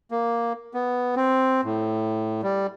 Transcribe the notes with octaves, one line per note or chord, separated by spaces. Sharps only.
A#3
B3
C4
A2
G3